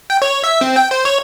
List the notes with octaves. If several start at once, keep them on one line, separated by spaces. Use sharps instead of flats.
G5
C#5
E5
C4
G5
C5
C#5